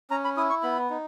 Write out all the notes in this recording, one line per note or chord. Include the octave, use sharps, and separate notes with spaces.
C#4 A#5
B5
E4 D#6
C#6
B3 B5
D#4